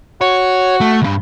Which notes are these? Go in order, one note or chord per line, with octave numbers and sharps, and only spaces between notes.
F#4 C#5
A3
C#2 G2